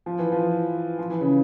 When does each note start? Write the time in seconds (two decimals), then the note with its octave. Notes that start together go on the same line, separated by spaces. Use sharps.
0.06 F3
0.19 E3
0.32 F3
0.99 F3
1.10 E3
1.21 C#3